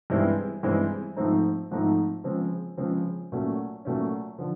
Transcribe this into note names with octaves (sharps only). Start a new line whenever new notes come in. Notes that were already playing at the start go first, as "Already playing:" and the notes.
G2 E3 G#3 C4 E4
G2 E3 G#3 C4 E4
G#2 F3 A3 C4 D#4
G#2 F3 A3 C4 D#4
C#3 F3 G#3 C4
C#3 F3 G#3 C4
A#2 F#3 A3 C#4
A#2 F#3 A3 C#4
D3 F3